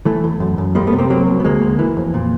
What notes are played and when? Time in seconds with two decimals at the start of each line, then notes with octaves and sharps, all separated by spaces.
0.05 E3 A3
0.24 E2
0.40 F#2
0.58 F#2
0.75 G3 G#3 A#3
0.87 A3 B3
0.93 C3
0.98 A#3 C4
1.10 F#3 A#3 C4
1.27 C2
1.40 B3
1.44 D2 G#3 A#3
1.62 D2
1.79 E3
1.97 F2
2.14 A#2